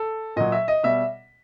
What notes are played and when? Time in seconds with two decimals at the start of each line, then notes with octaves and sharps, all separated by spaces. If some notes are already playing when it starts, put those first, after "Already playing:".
Already playing: A4
0.36 A#2 F#3 D#5
0.52 E5
0.68 D#5
0.83 B2 G3 E5